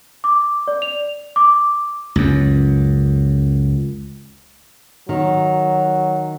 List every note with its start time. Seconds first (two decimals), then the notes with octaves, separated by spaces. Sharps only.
0.24 D6
0.68 D5
0.82 F7
1.36 D6
2.16 C#2 F#2
5.09 D#3 F#3